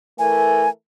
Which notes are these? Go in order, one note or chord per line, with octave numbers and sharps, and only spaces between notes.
E3 A3 A#4 G#5